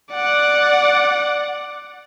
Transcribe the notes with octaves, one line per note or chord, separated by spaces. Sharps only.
D5 F#5